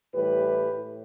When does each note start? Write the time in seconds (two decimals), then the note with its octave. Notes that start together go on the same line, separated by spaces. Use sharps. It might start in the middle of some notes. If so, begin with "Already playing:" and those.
0.15 A2 E3 G3 G4 B4
0.72 A2